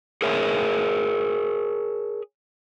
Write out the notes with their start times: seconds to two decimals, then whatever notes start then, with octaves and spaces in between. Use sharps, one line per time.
0.22 G#4 A#4 C#5 E5